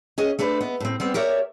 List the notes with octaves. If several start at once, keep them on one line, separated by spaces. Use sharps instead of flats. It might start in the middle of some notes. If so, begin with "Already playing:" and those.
C#4 G#4 D#5
A3 D4 B4 C5
B3 D#5
A2 C4
G3 B3 C4
G4 A#4 C#5 D5 E5